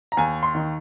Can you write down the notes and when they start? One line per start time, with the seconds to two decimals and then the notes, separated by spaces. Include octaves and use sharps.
0.12 A#5
0.17 D#2 G#5
0.43 C6
0.55 D#3